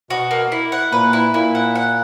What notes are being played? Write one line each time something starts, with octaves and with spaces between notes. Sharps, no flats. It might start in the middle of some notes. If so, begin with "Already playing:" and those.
B2 B3 F#4
A#3
E4
F#5
A#2 A#3 B4
E4
A#2 A#3 E4
F#5
F#5